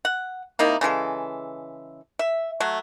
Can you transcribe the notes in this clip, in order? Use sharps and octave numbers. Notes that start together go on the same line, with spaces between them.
F#5
C3 A#3 D#4 E4
C#3 E3 G#3 A4
E5
F#3 A3